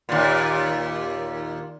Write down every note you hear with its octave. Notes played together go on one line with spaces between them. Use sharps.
D#2 A#2